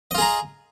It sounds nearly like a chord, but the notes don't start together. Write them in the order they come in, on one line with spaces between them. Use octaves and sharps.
D#5 F4 G#4 A#5